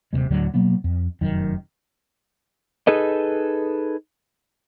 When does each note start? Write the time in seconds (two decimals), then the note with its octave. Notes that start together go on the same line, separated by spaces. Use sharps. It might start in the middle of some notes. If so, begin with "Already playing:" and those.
0.13 D#1 C2 C3 G#3
0.30 D2 A2 D3 F#3
0.54 B2 F#3 A#3 B3
0.84 F2
1.21 F1 F#2 D#3
2.87 D#4 G#4 A4 B4 D#5